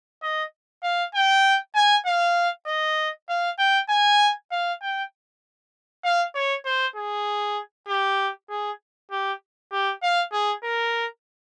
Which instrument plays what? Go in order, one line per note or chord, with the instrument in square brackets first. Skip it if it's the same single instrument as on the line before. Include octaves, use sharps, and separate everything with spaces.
[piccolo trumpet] D#5
F5
G5
G#5
F5
D#5
F5
G5
G#5
F5
G5
F5
C#5
C5
G#4
G4
G#4
G4
G4
F5
G#4
A#4